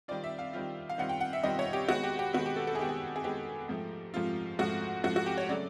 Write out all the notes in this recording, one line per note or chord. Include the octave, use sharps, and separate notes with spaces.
D#3 G3 C4 F4 D5
E5
F5
D#3 G3 C4 F4
F5
D#3 G3 C4 F4 F#5
G5
F#5
E5
D#3 G3 C4 F4 D#5
C#5
G4
D#3 G#3 B3 F#4
G4
G4
D#3 G#3 B3 F#4
G4
A4
A4
G#4
D#3 G#3 B3 G4
G#4
G#4
D#3 G#3 B3 G4
G#2 F3 A3
G#2 F3 A3 F4
G#2 F3 A3 F#4
G#2 F3 A3 F#4
F#4
G4
C#5
C#3 F#3 A3 D5